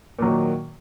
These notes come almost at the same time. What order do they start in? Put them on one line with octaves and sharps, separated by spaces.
A#2 F#3 D#3